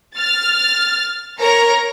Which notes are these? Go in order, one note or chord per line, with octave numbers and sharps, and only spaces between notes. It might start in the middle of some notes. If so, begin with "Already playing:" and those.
F6 A6
A#4 C#5 A#5